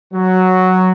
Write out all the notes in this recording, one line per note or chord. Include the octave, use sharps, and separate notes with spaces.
F#3